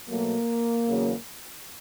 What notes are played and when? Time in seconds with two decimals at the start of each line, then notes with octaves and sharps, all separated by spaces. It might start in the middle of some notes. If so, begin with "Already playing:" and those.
0.09 B2 F#3 A3 A#3
0.84 E2 C#3 F#3